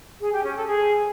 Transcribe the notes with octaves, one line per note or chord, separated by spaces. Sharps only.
G#4
G4
C#4
A4
G#4